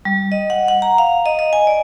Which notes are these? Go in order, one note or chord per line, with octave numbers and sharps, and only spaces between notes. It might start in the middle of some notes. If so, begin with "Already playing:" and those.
G3
D#5
F#5
F#5
A#5
F5
D#5
D#5
G#5
D5